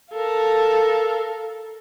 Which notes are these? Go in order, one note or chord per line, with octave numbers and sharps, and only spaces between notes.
A4 A#4 F5